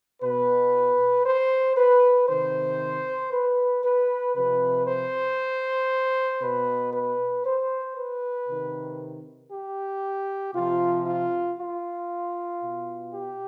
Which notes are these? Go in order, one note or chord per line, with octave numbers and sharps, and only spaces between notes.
B2 B4
C5
B4
C3 D#3 C5
B4
B4
C3 F3 B4
C5
B2 B4
B4
C5
B4
C3 D#3
G4
C3 F3 F4
F4
F4
B2
G4